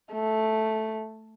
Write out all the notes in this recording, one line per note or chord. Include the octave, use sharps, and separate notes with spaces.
A3